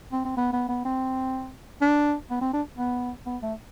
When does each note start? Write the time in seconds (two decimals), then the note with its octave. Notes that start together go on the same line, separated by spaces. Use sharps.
0.13 C4
0.25 C4
0.37 B3
0.53 B3
0.69 B3
0.85 C4
1.81 D4
2.30 B3
2.41 C4
2.54 D4
2.78 B3
3.26 B3
3.42 A3